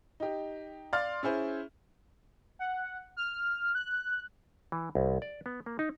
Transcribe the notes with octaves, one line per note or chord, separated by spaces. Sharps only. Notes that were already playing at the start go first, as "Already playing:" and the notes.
D#4 G4
D5 F5 C6 F6 A6
C#4 E4 G#4 C5
F#5
F6
F#6
E3
C2
D5
B3
A#3
D#4